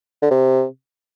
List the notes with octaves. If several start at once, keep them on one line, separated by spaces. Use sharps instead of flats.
D3
C3